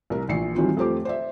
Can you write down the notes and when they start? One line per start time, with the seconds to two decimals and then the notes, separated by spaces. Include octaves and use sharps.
0.10 C2 A#4
0.29 A#1 E3 C7 C#7
0.55 D#3 E3 F#3 G3 C4 F4
0.77 F2 A3 G4 C5 D6
1.05 C5 D5 E5